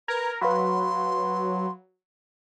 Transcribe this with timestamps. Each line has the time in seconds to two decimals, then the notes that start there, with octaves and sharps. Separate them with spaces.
0.08 A#4 B4 G#6
0.41 F#3 B4 F5 B5 C6